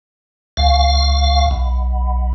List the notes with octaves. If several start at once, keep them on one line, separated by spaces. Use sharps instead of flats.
C#2 F5
B1